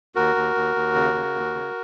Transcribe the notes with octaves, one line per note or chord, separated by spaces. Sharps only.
D#2 F#4 A#4
D#2
D#2
D#2
C#3
C#3
D#2
C#3